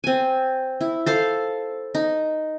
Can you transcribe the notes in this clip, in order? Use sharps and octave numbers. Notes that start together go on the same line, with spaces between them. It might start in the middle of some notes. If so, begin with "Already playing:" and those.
C4 G#5
E4
A4 C5 F5
D#4